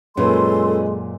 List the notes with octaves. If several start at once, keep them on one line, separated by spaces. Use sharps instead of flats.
F#2 A#2 G#3 C#4 F4 A4 B4 C6